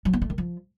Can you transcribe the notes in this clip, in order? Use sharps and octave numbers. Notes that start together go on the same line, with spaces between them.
F#3
B3
A3
D#3
F3